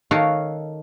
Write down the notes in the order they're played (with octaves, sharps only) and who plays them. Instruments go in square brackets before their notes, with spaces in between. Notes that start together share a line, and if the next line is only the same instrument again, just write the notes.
[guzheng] D#3 F#4 A4 C#5 F5